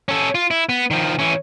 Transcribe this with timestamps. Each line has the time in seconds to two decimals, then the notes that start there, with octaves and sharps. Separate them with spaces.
0.08 C#4 A4
0.35 F4
0.51 E4
0.69 B3
0.91 D#3 F3
1.19 E3 C#4